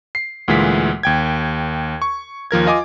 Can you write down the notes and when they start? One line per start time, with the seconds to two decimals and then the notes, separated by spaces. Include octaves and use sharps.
0.15 C7
0.48 D2 A#2 E3 G#3 B6
1.03 D#2 G5 G#6
2.02 C#6
2.51 D#2 F3 A#4 G#6
2.66 F4 D#5 G#5 D6